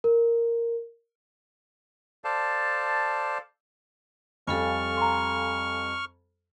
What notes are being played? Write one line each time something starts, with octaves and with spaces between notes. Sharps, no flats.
A#4
A4 C5 D5 F5 A5
F2 G3 A4 F5 G#5 C#6 F6
A#5 C6